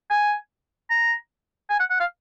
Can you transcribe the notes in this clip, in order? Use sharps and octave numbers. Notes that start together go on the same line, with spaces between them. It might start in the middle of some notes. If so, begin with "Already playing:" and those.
G#5
A#5
G#5
F#5
F#5
F5